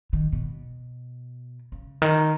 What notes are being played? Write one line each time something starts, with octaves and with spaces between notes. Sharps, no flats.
D#3
B2
C#3
D#3